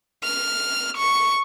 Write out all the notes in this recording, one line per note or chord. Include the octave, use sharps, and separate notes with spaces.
F6
C#6